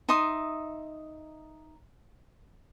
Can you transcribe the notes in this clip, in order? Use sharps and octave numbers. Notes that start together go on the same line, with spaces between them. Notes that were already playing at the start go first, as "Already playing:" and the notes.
D#4 E5 C6 D#6